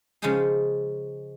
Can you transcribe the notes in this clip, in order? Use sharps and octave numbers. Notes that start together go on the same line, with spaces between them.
C#3 F3 G#3 C#4 D#4 G#4